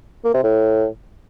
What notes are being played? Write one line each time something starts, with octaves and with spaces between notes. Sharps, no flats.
A#3
C3
A2